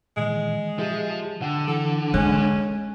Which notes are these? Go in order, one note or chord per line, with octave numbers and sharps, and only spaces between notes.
A#2 D#3 E3 G#3
F3 G4 G#4 E5
D3 F#5 G5
E3 A4
G#3 C#4 G#5 F#6